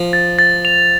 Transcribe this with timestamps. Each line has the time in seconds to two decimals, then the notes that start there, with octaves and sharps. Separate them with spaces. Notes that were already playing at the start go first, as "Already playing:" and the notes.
Already playing: F3
0.13 A6
0.39 A6
0.65 F7